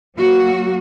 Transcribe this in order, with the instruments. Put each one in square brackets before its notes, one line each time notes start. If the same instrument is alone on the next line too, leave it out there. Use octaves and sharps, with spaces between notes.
[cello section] F#3 A#3 F#4